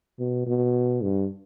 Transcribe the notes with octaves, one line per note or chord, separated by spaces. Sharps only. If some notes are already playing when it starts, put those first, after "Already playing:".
B2
B2
G2